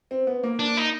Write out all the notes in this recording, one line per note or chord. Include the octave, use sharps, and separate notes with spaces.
C4
B3
A#3
D4
D#4